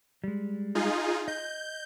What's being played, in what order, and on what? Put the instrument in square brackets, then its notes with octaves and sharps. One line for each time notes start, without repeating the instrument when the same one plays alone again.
[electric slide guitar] G3 G#3
[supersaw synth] D#4 F4 G#4
[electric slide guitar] D#5 [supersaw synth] G6